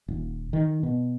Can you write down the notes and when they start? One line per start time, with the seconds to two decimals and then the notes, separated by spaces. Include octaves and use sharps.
0.08 D#1
0.53 D#3
0.83 B2